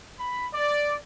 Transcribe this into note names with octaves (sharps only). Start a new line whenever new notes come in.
B5
D5